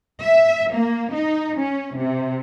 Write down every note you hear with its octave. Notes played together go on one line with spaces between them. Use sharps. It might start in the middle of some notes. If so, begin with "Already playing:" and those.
E5
A#3
D#4
C#4
C3